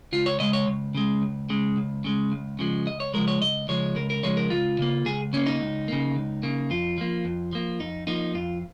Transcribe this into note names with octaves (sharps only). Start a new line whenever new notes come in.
C#2 F4
C#5
C#3 G#3 D#5
C#5
C#2
C#3 G#3
C#2
C#3 G#3
C#2
C#3 G#3
C#2
C#3 F3 G#3
C#2 D#5
C#5
C#3 F3 G#3 A#4
C#5
C#2 D#5
C#3 F3 G#3 C#5
C#2 A#4
A#4
C#3 F3 G#3 C#5
A#4
C#2 F4
C#3 A#3
C#2 G#4
C#3 A#3 C#4
D#4
C#2
C#3 A#3
C#2
C#3 A#3
F2 F4
F3 A#3
F2
F3 A#3
F2 D#4
F3 A#3 D#4
F2 F4